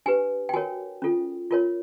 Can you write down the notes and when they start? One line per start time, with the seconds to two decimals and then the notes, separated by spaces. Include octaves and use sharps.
0.06 D4 G4 B4 G#5
0.49 G5
0.54 F#4 A#4 C#5 G#5
1.02 C#4 F4 A4
1.51 F4 A#4 C#5